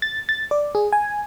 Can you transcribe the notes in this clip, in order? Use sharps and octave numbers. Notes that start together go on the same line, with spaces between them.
A6
A6
D5
G#4
G#5